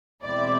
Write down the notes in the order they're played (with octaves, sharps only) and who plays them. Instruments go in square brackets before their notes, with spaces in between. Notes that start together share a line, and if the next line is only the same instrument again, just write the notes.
[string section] E2 B2 G#3 C4 E4 D5